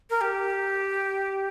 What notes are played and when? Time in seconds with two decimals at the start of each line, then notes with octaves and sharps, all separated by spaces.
0.10 A#4
0.21 G4